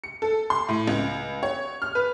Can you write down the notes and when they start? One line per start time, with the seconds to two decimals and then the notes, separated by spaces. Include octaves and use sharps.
0.04 C#7
0.22 A4
0.50 C6
0.69 A2
0.88 C#2
1.43 C#5
1.82 F6
1.95 B4